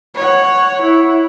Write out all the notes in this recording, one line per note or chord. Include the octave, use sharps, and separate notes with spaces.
C#5 F#5
E4